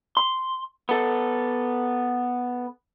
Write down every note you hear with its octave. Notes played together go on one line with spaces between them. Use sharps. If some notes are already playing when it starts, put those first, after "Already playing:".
C6
B3 A4